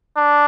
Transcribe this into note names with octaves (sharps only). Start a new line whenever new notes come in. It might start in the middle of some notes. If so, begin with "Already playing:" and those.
D4